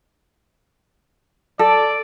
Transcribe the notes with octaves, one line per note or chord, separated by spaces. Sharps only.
A4 D5